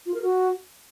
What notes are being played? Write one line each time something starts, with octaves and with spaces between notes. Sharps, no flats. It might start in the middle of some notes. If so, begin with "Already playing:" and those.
F4
A#4
F#4